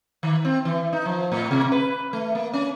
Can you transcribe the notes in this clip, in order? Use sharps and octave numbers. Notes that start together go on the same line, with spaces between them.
D#3
C4
E3
D#4
F3
A2
C3
B4
A3
A#3
C#4